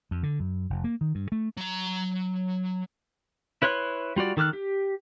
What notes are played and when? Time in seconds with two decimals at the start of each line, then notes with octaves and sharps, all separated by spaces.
0.11 F2
0.23 D3
0.40 F#2
0.70 F1
0.84 A#3
1.01 D#3
1.15 G2
1.32 A3
1.57 F#3 A#5
3.62 E4 B4 C#5 C6 F#6
4.16 G3 F4 F#4 D5
4.37 D#3 A4 D6 F6 F#6
4.53 G4